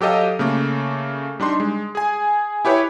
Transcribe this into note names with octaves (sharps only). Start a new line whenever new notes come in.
F#3 G4 A4 D#5 F5
C#3 A3 A#3
G3 D4 D#4 C6
G#3
G#4 G#5
E4 G4 B4 C#5